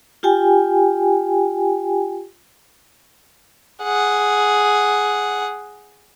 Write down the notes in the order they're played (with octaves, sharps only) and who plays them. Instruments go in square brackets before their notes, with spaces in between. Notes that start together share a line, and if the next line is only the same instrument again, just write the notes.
[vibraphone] F4 G4 G5 G#5
[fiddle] G#4 F#5